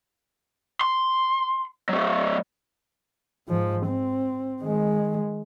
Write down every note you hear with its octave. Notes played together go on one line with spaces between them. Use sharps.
C6
F#3 A3
G#2 F3
C4
D#3 G#3